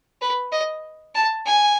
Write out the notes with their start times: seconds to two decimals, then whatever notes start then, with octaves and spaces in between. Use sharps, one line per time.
0.21 B4
0.52 D#5
1.15 A5
1.46 G#5